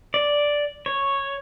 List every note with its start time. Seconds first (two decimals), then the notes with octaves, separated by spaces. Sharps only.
0.14 D5
0.86 C#5